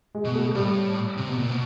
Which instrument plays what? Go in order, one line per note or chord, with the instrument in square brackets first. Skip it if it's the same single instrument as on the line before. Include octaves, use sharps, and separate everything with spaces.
[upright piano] G#3
[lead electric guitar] B2
[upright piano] A3
[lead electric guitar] A2 [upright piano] G3
[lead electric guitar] C3
B2
A#2
B2